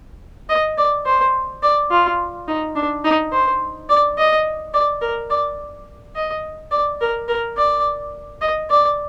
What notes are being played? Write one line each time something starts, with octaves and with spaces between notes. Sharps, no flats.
D#5
D5
C5
D5
F4
D#4
D4
D#4
C5
D5
D#5
D5
A#4
D5
D#5
D5
A#4
A#4
D5
D#5
D5